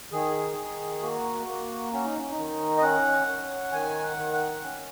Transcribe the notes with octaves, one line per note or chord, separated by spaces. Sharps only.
D#3 G#4
D#3
A#3 F#4
A#3
C#4 F#4
D#4
C#4
D#4
D#3
D#5
C#4 F#5
C#4
D#3 G#5
F#5
D#3
F#5
C#4